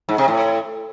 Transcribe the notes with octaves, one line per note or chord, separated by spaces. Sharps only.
G#2
C3
A2